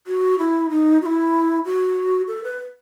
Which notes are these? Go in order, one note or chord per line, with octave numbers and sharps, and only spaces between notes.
F#4
E4
D#4
F#4
E4
F#4
A4
B4